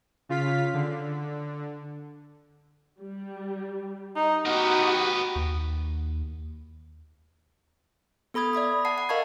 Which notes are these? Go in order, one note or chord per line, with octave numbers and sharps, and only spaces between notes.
C#3 F4 F5 B6
D3
G3
D#4
B3 D#4 F#4 G4 A#4
D#2
B3 A4 B5 D#6 G#6
D5 E5 B5 D#6
F#5 A5 C7
F#5
A#4 D#5 F5 A5 C#6 G#6